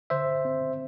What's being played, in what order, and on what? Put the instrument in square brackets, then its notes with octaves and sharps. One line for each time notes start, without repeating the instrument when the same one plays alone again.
[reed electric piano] D3 [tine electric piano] C5 E5
[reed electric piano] C4